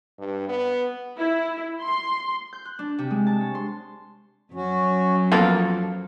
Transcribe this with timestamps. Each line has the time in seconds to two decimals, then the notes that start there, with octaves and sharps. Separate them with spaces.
0.18 G2
0.49 B3
1.18 E4
1.81 C6
2.53 G6
2.65 F#6
2.79 D4
2.99 C3
3.11 G#3
3.27 A5
3.41 C#5
3.55 C6
4.54 F#2 F#3 C#4 F#4
5.32 F3 A#3 B3 F4 A4